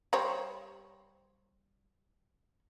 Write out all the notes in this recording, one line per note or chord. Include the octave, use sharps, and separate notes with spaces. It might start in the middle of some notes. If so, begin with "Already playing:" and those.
G3 C5 C#5